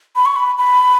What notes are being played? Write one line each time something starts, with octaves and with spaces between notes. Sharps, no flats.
B5
C#6
B5
B5